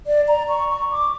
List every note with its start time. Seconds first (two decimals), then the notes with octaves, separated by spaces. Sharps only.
0.07 D5
0.28 A#5
0.49 C#6
0.70 C#6
0.91 D6